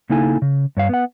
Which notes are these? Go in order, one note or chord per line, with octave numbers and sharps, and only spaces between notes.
C#3 A#3 D#4 E4 A4 G#5
C#3
G2 C#5 F5
B3 F#5